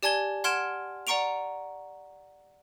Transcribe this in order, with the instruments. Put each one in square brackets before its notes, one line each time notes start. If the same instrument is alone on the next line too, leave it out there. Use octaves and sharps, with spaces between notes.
[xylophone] G4 D5 G#5 A5 G#6 G7
F#5 C6 F6 G#6 D7 E7
D5 F#5 A#5 C#6 D7 F7